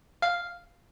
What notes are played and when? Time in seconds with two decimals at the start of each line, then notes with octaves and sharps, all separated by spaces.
0.22 F5